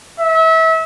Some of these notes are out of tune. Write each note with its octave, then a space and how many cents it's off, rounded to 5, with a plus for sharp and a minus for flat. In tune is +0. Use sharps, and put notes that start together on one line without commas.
E5 -30